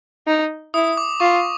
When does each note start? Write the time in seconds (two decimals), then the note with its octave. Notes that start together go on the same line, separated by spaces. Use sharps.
0.27 D#4
0.74 E4 D#6
0.97 D6
1.20 F4 C#6